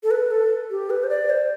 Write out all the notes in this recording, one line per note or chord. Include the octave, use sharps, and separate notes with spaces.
A4
B4
A4
G4
B4
C5
D5
C5